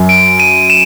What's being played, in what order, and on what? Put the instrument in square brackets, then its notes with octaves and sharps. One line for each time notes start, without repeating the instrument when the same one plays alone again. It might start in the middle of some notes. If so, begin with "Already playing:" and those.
Already playing: [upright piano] F#2 F#3
[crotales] D7
D#7
E7